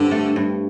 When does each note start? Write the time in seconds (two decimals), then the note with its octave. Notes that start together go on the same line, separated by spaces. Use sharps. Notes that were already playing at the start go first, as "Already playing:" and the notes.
Already playing: G2 D3 C4
0.11 A3
0.36 G2